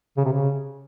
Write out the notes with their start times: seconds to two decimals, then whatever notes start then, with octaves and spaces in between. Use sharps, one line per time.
0.17 C#3
0.25 C3
0.33 C#3